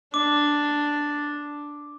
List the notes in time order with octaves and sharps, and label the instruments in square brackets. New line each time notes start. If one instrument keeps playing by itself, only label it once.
[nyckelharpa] D4 [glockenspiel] D6